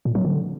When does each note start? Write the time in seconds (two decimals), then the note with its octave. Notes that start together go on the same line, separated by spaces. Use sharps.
0.05 A#2
0.15 F#3
0.25 D3